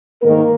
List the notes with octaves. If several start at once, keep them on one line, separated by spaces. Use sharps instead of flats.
G#2 D#3 A#3 A#4